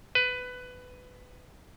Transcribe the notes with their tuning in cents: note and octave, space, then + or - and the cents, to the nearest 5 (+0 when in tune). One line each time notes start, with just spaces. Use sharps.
B4 +15